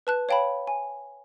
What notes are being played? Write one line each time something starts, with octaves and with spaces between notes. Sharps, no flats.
B4 A5 F#6
C#5 F5 G5 A5 B5
G#5